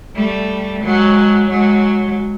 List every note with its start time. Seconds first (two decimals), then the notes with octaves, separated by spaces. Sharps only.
0.16 G3 A3
0.83 F#3 G#3
1.49 F#3 G#3